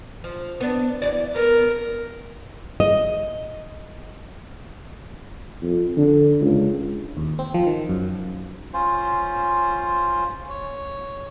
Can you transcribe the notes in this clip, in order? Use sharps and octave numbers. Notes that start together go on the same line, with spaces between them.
F3
B3 D4
E3 F#4 D5
B3 A#4
D#5
F2
D3
C#2
D#2
C4
F3
D#3
F#2
C#4 F4 C5
C#5